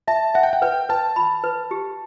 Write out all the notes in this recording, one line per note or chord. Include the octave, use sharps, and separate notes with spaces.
E5 A5
E5 F#5
G5
F#5
B4 G5
B4 A5
B5
B4
G4